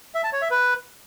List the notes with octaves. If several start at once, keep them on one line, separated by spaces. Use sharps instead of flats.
E5
A5
C#5
E5
B4